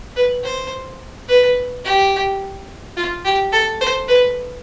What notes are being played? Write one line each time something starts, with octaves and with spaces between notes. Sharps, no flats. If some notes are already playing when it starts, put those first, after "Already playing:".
B4
C5
B4
G4
F4
G4
A4
C5
B4